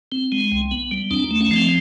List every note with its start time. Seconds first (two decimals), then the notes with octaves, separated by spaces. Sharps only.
0.12 C4
0.32 G#3
0.52 C2
0.71 B3
0.91 G3
1.11 D#2 C4 D4
1.31 A3
1.41 C#4
1.51 F3
1.56 C4